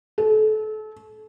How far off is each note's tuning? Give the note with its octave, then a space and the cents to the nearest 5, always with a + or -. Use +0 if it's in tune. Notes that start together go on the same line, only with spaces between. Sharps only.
A4 -30